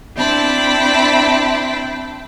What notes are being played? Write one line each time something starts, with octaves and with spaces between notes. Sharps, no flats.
C4 D4 E4 G5 A5 B5